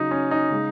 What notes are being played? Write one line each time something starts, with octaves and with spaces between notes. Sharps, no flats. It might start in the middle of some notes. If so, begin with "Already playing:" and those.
Already playing: C#3 F#3 D#4
C#4
D#4
C#3 G#3